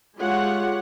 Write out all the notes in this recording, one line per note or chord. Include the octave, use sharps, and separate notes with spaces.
G#3 F4 G4 C#5 F#5